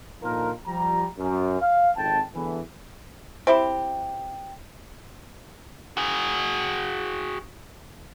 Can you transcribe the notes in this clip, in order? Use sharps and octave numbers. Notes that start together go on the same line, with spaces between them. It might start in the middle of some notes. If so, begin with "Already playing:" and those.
A#2 D3 F3 D#4 F4 A#4
F3 G3 A#5
F#2
F5
G#1 F2 G5 A5
E2 A2 D3 E3
C4 E4 G4
F#4 G#4